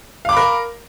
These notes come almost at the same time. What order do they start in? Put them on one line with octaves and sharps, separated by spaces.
F5 D6 B5 A#4